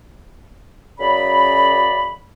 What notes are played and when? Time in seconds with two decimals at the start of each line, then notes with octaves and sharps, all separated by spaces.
0.99 F#2 C#3 D5 B5